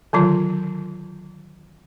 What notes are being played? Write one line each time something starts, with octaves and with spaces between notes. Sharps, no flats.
D3 D#3 F#3 F4